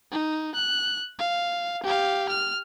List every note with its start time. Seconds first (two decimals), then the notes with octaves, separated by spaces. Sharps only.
0.12 D#4
0.55 F#6
1.19 F5
1.83 G4 F5
2.29 F6